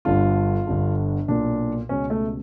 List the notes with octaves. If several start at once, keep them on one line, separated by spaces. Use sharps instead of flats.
G1 G2 D3 F4
G1 G2 D3
B1 A#2 D4
C#2 B2 C#4
A3